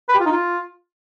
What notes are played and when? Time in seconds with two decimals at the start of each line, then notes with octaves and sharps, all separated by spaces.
0.09 B4
0.14 G4
0.20 F4
0.26 D#4
0.32 F4